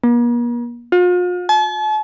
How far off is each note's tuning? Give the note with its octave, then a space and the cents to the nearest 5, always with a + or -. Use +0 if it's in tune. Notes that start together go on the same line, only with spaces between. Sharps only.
A#3 +45
F4 +40
A5 -45